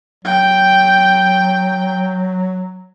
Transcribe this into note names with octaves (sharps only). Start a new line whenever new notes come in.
F#3 G5